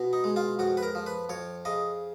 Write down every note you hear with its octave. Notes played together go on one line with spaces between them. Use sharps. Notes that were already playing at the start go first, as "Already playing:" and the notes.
Already playing: B2 B3
D#4
G#3
F4
F2 F#4
B4
A#4
F3
B4
F2 C#5
C#3 D#5